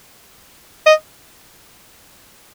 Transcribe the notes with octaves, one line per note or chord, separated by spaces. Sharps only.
D#5